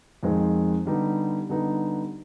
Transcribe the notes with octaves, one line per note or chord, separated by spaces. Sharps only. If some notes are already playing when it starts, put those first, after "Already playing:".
F2 D#3 G#3 C4
D3 G3 B3 D#4
D3 G3 B3 D#4